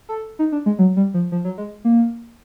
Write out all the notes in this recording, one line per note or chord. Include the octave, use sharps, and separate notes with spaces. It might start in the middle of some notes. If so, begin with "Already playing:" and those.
A4
D#4
D4
G#3
F#3
G3
F3
F3
F#3
G#3
A#3